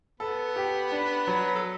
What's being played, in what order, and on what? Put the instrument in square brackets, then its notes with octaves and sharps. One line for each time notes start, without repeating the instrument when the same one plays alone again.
[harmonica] B3 B4 [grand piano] A4
[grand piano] G4
D4
F#3
[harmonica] A4